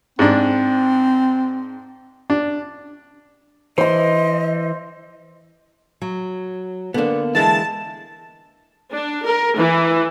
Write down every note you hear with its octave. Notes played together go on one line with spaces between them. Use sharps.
G#2 C4 D4
D4
E3 C5 D#5 C6
F#3
D3 A#3 B3 D4
E3 G#3 E4 A5
D4
A#4
E3